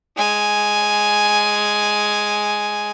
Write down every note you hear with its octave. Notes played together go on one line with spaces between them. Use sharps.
G#3 G#5